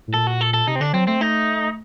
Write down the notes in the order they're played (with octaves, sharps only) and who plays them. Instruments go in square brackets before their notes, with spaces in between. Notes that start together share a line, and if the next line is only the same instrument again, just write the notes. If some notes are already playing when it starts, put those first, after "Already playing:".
[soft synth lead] A2
[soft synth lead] A#2 [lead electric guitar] A4
[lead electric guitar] F#4
A4
A4
[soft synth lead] C3 [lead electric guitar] D#4
[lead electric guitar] C4
[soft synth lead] D3 [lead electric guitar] D4
[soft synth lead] F#3 [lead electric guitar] C4
[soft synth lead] A3 [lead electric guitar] C4
[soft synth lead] A3 [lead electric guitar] D#4